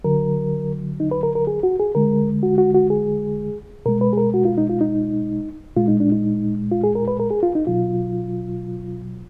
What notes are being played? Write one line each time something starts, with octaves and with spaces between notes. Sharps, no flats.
D3 F#3 A#4
D#4
B4
A#4
A#4
G#4
F#4
G#4
D3 G#3 A#4
F#4
F#4
F#4
G#4
B2 G#3 A#4
B4
G#4
A#4
F#4
F4
D#4
F4
D#4
A#2 G#3 F4
D#4
D4
D#4
F4
G#4
A#4
B4
A#4
G#4
F4
D#4
B2 F#3 F4